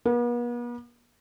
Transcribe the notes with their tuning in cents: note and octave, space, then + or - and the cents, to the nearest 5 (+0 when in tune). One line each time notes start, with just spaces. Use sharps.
B3 -45